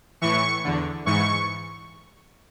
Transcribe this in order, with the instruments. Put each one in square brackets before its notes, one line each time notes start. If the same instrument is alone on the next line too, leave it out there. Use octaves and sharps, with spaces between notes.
[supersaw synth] A2 E3 C#6
E2 D3
G#2 E3 C#6